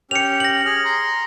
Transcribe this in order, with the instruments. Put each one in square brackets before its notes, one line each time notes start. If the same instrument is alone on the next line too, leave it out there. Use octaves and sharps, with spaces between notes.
[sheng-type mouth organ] C#4 G4 [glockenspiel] C#7 F7
[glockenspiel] A#6 F#7
[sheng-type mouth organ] G#4 F6
A#5 C6